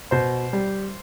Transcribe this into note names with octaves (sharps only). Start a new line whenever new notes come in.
B2 C5
G3